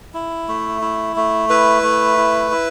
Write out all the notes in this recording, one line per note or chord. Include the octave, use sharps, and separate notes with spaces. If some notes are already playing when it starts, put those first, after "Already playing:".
E4
A3
E4
A3
E4 B4
A3
E4
E4